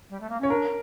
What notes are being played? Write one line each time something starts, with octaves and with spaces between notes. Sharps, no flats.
G3
A3
A#3
C#4 C#5
D4 A#4